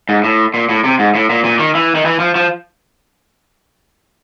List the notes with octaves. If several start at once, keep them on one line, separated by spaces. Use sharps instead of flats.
G#2
A2
A#2
A2
C3
G#2
A2
A#2
A#2
D#3
E3
D#3
E3
F3
F3